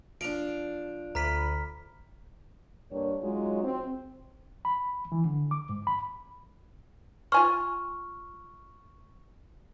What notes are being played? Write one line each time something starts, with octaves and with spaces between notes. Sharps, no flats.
F3 D4 D7 F7
D2 A#5 B5 F6 B6
G2 A#3 C#5
F#3 G#3 C#4 D#4 F4 F#4
C4
B5
E3
D3
D6
G#2
B5
F4 G#5 C6 C#6 F6